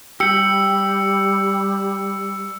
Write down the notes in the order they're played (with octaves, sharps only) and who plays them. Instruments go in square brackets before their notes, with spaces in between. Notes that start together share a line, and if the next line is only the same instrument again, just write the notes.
[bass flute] G3 [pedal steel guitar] G4 G5 [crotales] E6 C#7